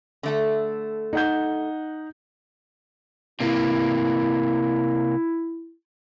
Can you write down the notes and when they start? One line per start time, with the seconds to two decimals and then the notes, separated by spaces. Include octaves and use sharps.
0.23 D3 A3 A4
1.13 D#4 F#5 G6
3.40 C3 A#3 E4